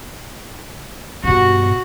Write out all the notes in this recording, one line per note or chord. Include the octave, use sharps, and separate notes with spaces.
G2 B2 F#4